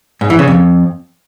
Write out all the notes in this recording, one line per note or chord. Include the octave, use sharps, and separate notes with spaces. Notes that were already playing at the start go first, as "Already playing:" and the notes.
G#2
E3
C#3
F2